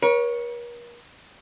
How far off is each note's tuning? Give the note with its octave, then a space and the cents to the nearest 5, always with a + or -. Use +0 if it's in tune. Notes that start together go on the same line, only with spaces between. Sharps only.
A#4 +45 C#5 +0